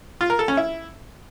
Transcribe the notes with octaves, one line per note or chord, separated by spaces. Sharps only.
F4
A#4
A4
C#4
E4